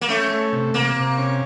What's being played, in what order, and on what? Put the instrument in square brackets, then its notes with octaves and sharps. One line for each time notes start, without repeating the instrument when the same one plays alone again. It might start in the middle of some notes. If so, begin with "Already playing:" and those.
[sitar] A#3
[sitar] A3 [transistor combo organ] C#4
[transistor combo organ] A3
C3
[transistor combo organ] C3 [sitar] A#3
[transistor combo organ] C3
C#4